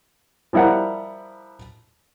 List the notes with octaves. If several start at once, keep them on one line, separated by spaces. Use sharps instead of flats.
F3 G3 E4 A#4 F#5